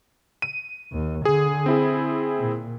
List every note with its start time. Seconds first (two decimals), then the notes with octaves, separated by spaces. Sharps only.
0.42 D#7
0.92 D#2
1.25 D3 G#4
1.66 C4 E4 G#4
2.39 A#2